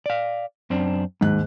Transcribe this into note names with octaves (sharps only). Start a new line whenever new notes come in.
D5 F5
F#2 C4 D4
D#2 G#2 F#6